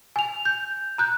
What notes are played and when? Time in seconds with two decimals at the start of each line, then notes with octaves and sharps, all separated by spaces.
0.16 G#5 F7
0.45 G6
0.98 A#5 F#6 G6